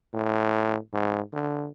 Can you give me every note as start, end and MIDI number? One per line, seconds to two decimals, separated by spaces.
0.13 0.76 45
0.93 1.21 44
1.33 1.68 50